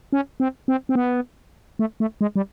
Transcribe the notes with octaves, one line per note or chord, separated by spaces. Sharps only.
C#4
C4
C4
C4
B3
A3
A3
G#3
G3